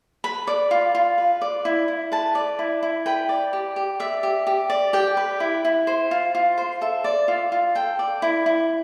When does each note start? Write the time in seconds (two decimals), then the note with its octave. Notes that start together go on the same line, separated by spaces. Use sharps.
0.24 B4 B5
0.47 D5
0.71 F4
0.95 F4
1.18 B4
1.42 D5
1.65 E4
1.88 E4
2.12 B4 A5
2.35 D5
2.59 E4
2.83 E4
3.06 B4 G5
3.29 D5
3.53 G4
3.76 G4
4.00 D5 E5
4.23 G4
4.47 G4
4.70 D5
4.93 G4 G5
5.17 B4
5.40 E4
5.65 E4
5.87 C5
6.11 F4
6.35 F4
6.58 C5
6.81 A4 E5
7.04 D5
7.28 F4
7.52 F4
7.75 A4 G5
7.99 D5
8.22 E4
8.46 E4